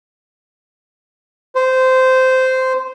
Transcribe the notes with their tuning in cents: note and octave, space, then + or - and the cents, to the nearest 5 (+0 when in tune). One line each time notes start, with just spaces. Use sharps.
C5 -15